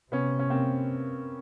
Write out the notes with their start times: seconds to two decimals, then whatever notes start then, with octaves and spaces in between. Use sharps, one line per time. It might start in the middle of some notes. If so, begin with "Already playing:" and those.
0.12 C3 B3 C#4
0.39 C#4
0.50 A#3 C4